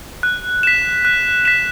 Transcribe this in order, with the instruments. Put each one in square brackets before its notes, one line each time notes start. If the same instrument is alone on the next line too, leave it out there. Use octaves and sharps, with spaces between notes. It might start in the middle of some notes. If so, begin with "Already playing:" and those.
[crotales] F#6
B6 E7
F#6
B6 E7